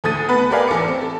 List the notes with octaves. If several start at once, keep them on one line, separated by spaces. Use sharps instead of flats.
D2 A3 D#6 A6 D#7
B3 B4
G4 A#4 B4 D5 F5 G#5
A1 A4 A#4 D6 C#7
C4
A4